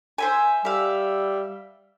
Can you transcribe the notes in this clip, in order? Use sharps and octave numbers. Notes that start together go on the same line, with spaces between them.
C5 E5 G#5
G3 E5 F5